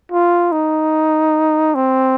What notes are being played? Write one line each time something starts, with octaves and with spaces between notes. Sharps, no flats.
F4
D#4
C4